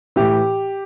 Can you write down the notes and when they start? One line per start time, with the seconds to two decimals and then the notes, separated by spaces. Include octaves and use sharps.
0.16 A2 E3 G4